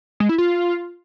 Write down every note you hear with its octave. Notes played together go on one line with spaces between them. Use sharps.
G#3
E4
F4